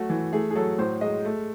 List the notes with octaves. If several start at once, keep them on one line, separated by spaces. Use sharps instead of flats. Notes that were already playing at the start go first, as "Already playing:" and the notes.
Already playing: F#3 A3 F#4
E3
A3 G#4
G#4
F#3 A4
A2 C5
G#3 D#5
A3